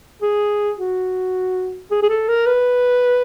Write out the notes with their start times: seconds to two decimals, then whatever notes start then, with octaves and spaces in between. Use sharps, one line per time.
0.22 G#4
0.78 F#4
1.91 G#4
2.03 G#4
2.09 A4
2.28 A#4
2.47 B4